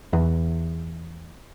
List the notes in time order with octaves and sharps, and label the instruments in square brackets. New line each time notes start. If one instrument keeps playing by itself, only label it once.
[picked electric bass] E2